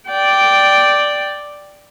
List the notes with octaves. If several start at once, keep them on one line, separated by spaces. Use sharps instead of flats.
D5 G5